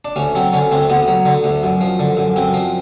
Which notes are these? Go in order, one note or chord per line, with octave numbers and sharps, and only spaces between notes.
D4
D2 C#4
F#3 C4
D3 C#4
D2 C4
D2 B3
F#3
D3
D2
F#2
F3
D3
F#2
F#2 C4
F3